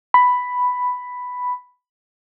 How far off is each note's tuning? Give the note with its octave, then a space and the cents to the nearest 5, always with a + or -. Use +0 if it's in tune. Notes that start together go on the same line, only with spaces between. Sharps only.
B5 +5